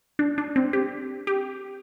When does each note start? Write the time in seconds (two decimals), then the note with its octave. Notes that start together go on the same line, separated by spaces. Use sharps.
0.19 D4
0.38 D4
0.56 C4
0.73 G4
1.27 G4